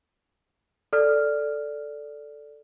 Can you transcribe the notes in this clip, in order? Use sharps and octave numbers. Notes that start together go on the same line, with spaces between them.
A4 D5 F6